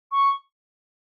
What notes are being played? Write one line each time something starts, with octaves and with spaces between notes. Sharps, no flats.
C#6